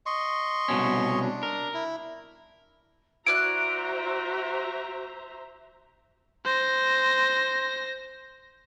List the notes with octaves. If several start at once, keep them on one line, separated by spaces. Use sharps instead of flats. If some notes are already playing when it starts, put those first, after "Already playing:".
D#5 C6 C#6
C2 B2 C#4
D4
A#4
E4
E4 F#4 C5 D5 E5 A#5 F#6 D7
C5 A#6